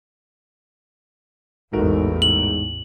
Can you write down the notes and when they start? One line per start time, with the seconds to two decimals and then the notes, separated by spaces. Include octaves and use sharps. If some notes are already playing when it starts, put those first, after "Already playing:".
1.73 A1 E2 G#2 A3 F#4 A#4
2.22 G#2 F#7